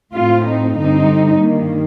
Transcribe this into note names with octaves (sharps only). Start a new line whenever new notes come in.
A2 A3 C4 F4
D#4
G2 D3 G3 C4 D#4
G2 D#3 G3 A#3